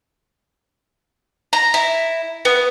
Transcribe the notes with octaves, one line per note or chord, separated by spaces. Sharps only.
A#5
E4
B3